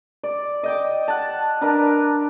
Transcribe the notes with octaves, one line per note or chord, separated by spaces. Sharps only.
D5
D#5 G5 D6
F#5 A5
D4 A#4 B4